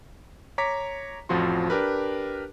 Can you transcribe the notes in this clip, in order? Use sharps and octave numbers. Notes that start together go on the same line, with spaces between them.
C#5 A#5 D6 B6
A1 F2 F3 F4 F#4 C6
D4 G4 A#4 B4